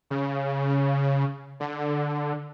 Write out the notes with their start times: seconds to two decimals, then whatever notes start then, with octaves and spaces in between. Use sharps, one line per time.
0.10 C#3
1.60 D3